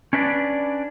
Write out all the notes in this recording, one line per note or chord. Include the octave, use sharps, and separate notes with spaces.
C#4 D4 B4 C5 D5